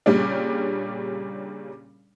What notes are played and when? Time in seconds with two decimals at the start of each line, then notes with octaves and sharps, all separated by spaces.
0.06 A#2 C#3 G3 C#4 D4